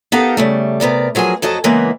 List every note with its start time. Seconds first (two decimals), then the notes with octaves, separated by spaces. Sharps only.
0.12 B3 D#4 G4 A4 A#4 F5
0.37 C#3 G3 A3
0.80 C3 B3 A#4 D5
1.15 F3 F#3 G#4 A#4 G#5
1.42 F2 F#3 A4 D#5 A5
1.64 C#3 E3 G#3 A#3 B3